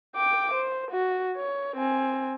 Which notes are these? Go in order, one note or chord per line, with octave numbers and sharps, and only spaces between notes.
G5 D6
C5
F#4
C#5
C4 G#5